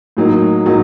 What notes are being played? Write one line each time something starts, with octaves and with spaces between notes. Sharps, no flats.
A2 F#3 A#3 D#4
A2 F#3 A#3 D#4